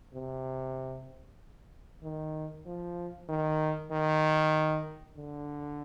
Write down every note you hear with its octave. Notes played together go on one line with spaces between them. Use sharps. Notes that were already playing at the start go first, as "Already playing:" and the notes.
C3
D#3
F3
D#3
D#3
D3